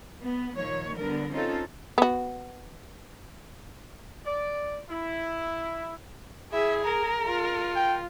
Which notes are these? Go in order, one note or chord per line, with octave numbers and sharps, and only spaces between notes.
B3
A#2 D#3 F3 C#5
D3 G3 B3 A#4
C4 C#4 D#4 F4 A4
B3 F#4
D5
E4
E4 G#4 E5
A#4 A#5
F4
G5